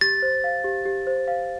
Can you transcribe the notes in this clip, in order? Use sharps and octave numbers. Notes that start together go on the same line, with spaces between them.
G4 A6
C5
F5
G4
G4
C5
F5